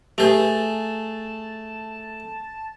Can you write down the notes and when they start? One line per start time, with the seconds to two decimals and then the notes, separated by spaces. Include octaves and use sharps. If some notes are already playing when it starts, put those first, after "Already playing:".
0.18 A3 G4 G#4 B4 A5